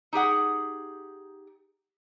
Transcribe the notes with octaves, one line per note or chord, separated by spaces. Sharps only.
D#4 G4 G#4 F#5